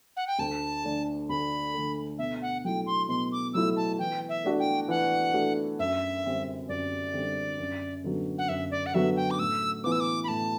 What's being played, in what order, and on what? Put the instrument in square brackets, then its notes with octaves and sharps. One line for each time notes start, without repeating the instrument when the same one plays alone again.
[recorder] F#5
G5
[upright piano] D2 [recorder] A5
[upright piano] D3 A3 D4 A4
[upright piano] D2 [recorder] B5
[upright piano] D3 A3 D4 A4
[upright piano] B2 [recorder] E5
[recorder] F#5
[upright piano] F#3 A3 E4 [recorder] G5
[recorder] C6
[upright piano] B2 [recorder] C6
[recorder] D6
[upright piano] F#3 A3 E4 [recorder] E6
[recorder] A5
[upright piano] E3 [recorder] G5
[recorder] E5
[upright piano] A3 D4 F#4
[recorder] G5
[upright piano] E3 [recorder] F#5
[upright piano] A3 D4 F#4
[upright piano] F#2 [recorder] E5
[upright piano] D3 G3 C4
[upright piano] F#2 [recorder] D5
[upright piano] D3 G3 C4
F#2
D3 F#3 B3 F#4
[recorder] F#5
[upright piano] F#2 [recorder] E5
[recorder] D5
F#5
[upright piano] D3 F#3 B3 F#4 [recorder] E5
[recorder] G5
D6
[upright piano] A2 [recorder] E6
[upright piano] E3 B3 [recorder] D6
[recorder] E6
D6
B5
[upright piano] A2 [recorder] A5